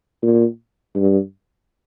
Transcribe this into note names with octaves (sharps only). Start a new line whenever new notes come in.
A#2
G2